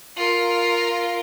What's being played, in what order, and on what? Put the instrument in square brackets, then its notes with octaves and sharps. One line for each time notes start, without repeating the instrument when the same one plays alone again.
[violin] F4 A#4